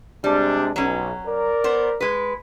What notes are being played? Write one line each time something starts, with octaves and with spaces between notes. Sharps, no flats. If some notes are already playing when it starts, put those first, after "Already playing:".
C3 G3 G#3 D4
B1 F#3 C#4
A#4 D5
B3 C5
G#3 B4